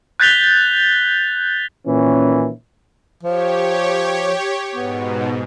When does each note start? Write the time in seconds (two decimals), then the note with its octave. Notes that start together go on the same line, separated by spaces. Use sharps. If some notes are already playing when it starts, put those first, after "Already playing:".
0.20 F#6 G6 A6 B6 F7 G7
1.87 A#2 D#3 E3 C#4
3.23 F3 G4 C#5
4.75 G#2 B2 B3